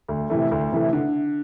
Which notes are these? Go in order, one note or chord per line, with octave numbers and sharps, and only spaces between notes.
D2
C3 E3 A3
D2
C3 E3 A3
D3